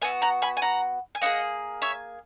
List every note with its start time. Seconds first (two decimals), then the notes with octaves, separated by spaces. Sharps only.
0.02 B3 F#4 E5 G#5
0.22 F#5 A#5
0.42 G#5 B5
0.57 G#5
0.62 F#5 A#5
1.15 G#5
1.22 A#3 E4 G#4 D#5 F#5
1.82 C#5 E5